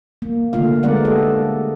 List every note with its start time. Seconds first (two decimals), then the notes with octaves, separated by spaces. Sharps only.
0.22 A#3
0.53 D3 A3 A#3 F4 F5
0.83 G#3 A3 B3 A#4 D5 F#5
1.05 G4 A4 D#5